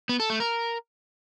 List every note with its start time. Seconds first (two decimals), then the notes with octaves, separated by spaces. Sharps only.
0.09 B3
0.20 A4
0.30 A3
0.40 A#4